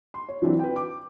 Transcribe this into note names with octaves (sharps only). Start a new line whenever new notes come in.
C6
C#5
E3 F#3 C4 D4 E4
B4 G5
D6